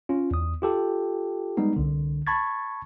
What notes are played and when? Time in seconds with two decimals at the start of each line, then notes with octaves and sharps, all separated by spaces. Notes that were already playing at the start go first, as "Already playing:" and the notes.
0.09 C#4 F4
0.31 E2 D#6
0.62 F4 G4 A4
1.57 G3 G#3 B3 D#4
1.76 C2 D3
2.27 A5 B5 C#6 G#6 A6